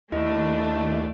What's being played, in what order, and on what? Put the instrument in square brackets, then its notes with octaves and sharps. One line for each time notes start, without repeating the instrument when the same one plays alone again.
[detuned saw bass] D#2 [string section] A3 D4 [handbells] E4 D#5